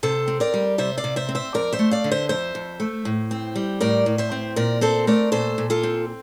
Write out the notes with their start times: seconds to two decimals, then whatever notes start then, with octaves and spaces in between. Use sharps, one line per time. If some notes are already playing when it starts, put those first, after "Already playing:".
0.03 C3 A4 C5
0.28 C4
0.40 A#4 D5
0.54 G3
0.78 C3 C5 E5
0.98 D5 F5
1.04 C3
1.16 C5 E5
1.29 C4
1.35 C5 E5
1.54 F2 A#4 D5
1.73 C5 E5
1.79 A3
1.91 D5 F5
2.04 D3
2.11 C5 E5
2.29 F2 C5 E5
2.55 F2
2.80 A3
3.05 A2
3.31 C4
3.56 G3
3.80 A2 A#4 D5
4.06 A2
4.18 C5 E5
4.32 C4
4.56 A#2 A#4 D5
4.81 C4 A4 C5
5.07 A3 A#4 D5
5.32 A#2 A4 C5
5.58 A#2
5.70 F4 A4
5.83 C4